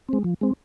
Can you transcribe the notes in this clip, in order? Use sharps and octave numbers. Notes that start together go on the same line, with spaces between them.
G#3 C4
F3
G#3 C4